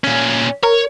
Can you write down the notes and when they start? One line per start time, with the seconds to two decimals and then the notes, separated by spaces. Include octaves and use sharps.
0.04 A#2 C#4
0.63 A#4 C#5